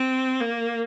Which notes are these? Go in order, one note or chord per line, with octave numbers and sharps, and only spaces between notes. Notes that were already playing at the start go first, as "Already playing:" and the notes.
Already playing: C4
A#3